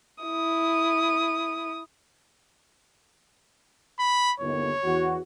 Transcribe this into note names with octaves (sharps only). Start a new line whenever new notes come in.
E4 D#6
B5
G1 D#2 C#5
E2 F#4